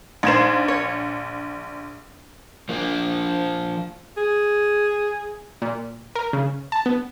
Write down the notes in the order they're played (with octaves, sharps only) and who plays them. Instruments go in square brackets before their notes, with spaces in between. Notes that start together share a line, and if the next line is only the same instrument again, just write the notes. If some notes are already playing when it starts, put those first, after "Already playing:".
[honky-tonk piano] A#1 G#6 E7 [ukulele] D#4 C5
[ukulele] C#5
[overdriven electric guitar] F3 A#3
[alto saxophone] G#4
[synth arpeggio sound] A#2
A#4
C#3
A5
B3